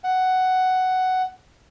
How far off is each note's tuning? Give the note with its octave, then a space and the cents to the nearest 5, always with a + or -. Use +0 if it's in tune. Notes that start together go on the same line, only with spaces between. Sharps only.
F#5 +5